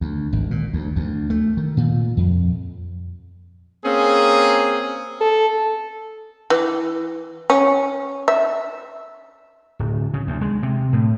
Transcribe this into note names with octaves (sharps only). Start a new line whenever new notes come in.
D2
G#1
A#2
D2
D2
A3
D#3
A#2
F2
A#3 C4 C#4 G#4
A4
E3
C#4
E5
D1
C#3
D2
G#3
C3
A2